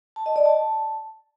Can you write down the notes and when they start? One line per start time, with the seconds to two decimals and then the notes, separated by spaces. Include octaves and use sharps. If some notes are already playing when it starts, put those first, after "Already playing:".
0.16 A5
0.26 D#5
0.36 D5
0.46 A5